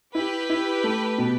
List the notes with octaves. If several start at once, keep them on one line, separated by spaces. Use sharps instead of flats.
E4 G4 B4
E4
A3
B2